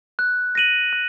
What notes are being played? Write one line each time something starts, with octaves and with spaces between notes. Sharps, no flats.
F#6
A#6 D#7 F#7
F#6